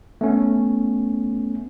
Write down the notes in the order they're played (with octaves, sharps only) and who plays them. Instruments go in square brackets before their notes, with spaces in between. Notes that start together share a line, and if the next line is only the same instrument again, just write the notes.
[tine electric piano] A3 B3 C#4